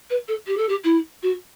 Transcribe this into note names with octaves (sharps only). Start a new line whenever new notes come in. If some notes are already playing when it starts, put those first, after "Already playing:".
B4
A4
G4
A4
G4
E4
F#4